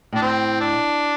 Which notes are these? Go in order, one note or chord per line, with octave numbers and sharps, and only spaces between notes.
A2 D4
C4
D4